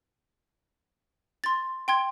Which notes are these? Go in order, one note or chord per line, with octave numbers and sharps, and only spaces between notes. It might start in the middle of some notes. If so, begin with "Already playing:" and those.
C6 A6
G5 C6 G#6